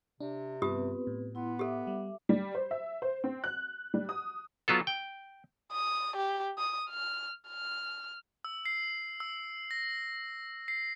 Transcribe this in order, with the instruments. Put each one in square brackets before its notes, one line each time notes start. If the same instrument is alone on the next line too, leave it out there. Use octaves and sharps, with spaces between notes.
[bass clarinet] C3 [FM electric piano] D4
[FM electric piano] G2 [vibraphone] B3 C4 B4 [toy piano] F4 G4 D#6
[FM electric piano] A2
[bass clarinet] B3 [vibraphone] E4 C6
[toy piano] G4 A4 [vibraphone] E5 D6
[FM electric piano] G3
[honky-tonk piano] G3
C5
E5
C5
C4
F#6
G3
D#6
[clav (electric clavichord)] F#3 B3 F4 A4
G5
[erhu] D#6
G4
D#6
F6
F6
[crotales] E6
C7
E6
A#6
C7